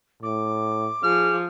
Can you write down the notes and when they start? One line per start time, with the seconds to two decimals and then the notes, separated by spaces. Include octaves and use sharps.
0.23 A2 D6
1.04 F3 G#4 F6